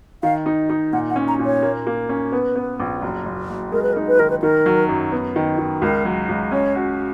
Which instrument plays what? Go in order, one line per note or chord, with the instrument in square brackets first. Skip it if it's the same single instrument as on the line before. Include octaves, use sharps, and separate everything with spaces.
[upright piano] D#3 [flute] F5
[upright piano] D#4
D#4
[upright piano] A#2 [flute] F#5
[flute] F#5
[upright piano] C#4
[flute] A#5
[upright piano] A#2
[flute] C#5
[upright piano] A#3
A#3
C#4
[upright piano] B3 [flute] B4
[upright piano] B3
A#1
F#1
F#1
F#1
[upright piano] G#3 [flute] A#4
[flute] B4
A#4
[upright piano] D#4
[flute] B4
[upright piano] D#3 [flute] A#4
[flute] B4
[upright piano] D#3 [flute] A#4
[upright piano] F#3
F#2
B3
D#3
D#3
[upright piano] C#2 [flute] A#4
[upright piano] F#3
C#2
[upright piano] C#4 [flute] C#5
[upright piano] F#4